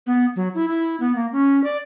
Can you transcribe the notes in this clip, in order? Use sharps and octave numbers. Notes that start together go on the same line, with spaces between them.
B3
F#3
E4
E4
B3
A#3
C#4
D5